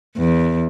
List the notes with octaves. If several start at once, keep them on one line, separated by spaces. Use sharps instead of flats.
E2